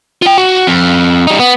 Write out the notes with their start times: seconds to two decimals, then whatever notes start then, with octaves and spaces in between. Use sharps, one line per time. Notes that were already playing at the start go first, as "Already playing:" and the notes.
0.22 F4 G5
0.38 F#4
0.67 F2
1.27 G3 D#4
1.39 B3